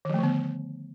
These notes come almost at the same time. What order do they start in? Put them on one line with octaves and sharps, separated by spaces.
D#3 F3 A3 D3 B3